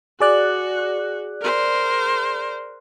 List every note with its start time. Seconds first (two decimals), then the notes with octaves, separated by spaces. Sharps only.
0.20 F#4 G#4 D5 F#6
1.42 A#4 C5